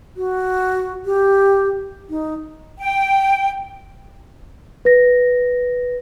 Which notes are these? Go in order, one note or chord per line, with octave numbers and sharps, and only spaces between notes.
F#4
G4
D#4
G5
B4 A#6